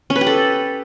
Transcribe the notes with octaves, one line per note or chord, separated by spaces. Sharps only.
C#4
B4
G4
A4